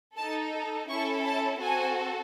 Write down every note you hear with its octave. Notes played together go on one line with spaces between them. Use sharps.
D#4 A4 A5
C#4 E4 A4 C#6
A5
C4 F#4 A4 G#5